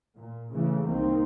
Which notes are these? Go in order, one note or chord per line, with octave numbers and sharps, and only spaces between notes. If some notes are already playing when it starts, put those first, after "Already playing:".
A#2
C#3 E3 A3
C2 D#3 A#3 C4